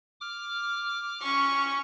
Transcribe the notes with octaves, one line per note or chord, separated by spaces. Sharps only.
D6 F6
C#4 C#6